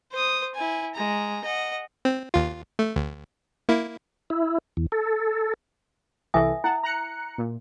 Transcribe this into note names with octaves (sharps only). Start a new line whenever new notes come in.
C5 D#6
E4 G#5
G#3 A#5
D#5 F#5
C4
D#2 F4
A3
D2
A#3 E4
E4
E2
A4
C2 E3 A4 E5 G#5 D#6
E4 F#5 A5
A#5 F#6 C#7
A#2